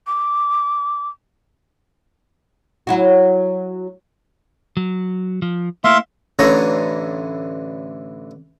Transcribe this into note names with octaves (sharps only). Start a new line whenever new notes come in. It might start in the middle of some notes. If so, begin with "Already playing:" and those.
D6
F#3 E4 F#4
F#3
F3
A3 A#3 E4 E5 F5 C6
A1 D3 E3 C#5 A#5